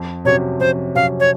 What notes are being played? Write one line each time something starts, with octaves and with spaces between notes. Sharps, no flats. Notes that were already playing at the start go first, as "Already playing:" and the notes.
Already playing: F2
C3 F#3 C#4 C#5
F2 C5
C3 F#3 C#4 F5
C#5